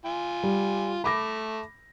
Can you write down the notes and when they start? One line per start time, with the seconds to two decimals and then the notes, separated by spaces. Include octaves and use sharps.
0.05 F4 G#5
0.44 G3
1.04 A3 B5 D6 A#6